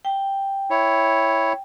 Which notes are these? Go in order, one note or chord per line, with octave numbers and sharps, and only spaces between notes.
G5
E4 C#5